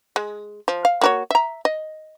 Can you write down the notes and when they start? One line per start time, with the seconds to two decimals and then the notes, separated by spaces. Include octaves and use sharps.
0.16 G#3
0.68 F3
0.85 F5
1.01 A#3 F#4 C#5
1.31 E5 A#5
1.65 D#5